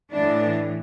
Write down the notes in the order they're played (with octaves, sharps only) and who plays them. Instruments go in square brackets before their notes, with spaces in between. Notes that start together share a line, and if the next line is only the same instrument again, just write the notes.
[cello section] A2 E3 D4